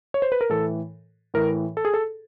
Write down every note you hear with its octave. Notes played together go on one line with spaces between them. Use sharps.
C#5
C5
B4
A#4
A2 E3 A4
A2 E3 A#4
A4
G#4
A4